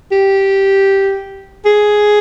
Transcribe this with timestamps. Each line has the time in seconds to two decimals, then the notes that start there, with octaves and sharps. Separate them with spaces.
0.12 G4
1.66 G#4